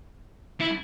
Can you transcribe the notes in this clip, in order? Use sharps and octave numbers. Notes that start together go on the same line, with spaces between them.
E4